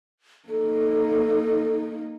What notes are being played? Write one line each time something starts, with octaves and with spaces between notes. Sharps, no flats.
A#3 D#4 A4